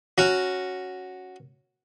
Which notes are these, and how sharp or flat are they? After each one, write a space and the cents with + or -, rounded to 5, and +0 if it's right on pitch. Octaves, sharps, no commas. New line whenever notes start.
C#4 +0 F#4 +0 A#5 +0